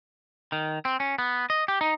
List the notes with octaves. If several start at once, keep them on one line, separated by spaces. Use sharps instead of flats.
D#3
C4
C#4
B3
D#5
G4
D#4